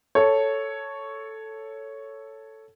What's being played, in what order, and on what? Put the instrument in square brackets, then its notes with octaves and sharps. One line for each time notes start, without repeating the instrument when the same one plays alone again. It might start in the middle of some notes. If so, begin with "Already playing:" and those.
[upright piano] A4 C#5